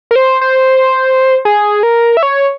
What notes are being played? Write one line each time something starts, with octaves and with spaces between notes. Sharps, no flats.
A#4
C5
C5
G#4
A#4
E5
C#5